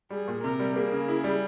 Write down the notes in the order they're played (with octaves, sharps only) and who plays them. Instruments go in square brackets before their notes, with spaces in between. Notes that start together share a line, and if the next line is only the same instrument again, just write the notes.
[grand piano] G3 [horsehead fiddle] G#4
[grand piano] A#2
[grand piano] C3 [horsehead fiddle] A#4
[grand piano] G3
[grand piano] A#3 [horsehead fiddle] G#4
[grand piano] C#3
E4
G3